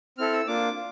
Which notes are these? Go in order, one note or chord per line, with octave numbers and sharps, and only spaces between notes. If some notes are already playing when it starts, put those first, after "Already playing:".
C4 E4 A4 F6
E6
A#3 D4 F4 D6
F4